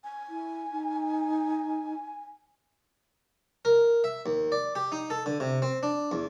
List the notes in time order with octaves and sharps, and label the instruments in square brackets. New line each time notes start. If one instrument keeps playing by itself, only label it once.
[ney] G#5
[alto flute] E4
D#4
[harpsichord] A#4
E5
D#2
D5
G4
D#4
A4
D3
C3
C4
D4
E2